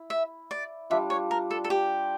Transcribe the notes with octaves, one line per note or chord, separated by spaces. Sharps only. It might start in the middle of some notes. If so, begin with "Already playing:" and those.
Already playing: E4
E5
D5
G3 D4 F4 E5
C#5
A#4
A4
A4
G4